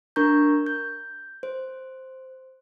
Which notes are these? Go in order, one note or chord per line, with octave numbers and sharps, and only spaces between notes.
D4 A#4 A#5 C#6 G6
G6
C5